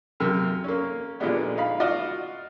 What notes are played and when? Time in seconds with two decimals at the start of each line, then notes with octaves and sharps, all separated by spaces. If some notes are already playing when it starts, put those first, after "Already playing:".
0.20 F#2 C3 A#3
0.64 A#3 C#4
1.20 A#2 D3 F3 G3 G#3 B3
1.57 D#4 F5 B5
1.80 F4 F#4 D5 D#5